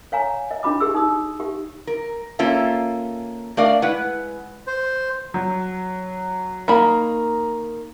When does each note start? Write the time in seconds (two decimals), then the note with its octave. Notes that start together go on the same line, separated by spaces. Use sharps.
0.12 C#5 F5 G#5 A#5
0.51 D#5
0.63 D4 F#4 B5 D6
0.80 G4 G#4 E6
0.94 D#4 D#6
1.40 G4
1.87 A#4
2.39 A#3 C#4 F4 A4 E5
3.57 A3 D4 A#4 D5 D#5 F5
3.82 G#3 E4 B4 F#5
4.67 C5
5.34 F#3
6.68 D#3 A#3 A#5 B5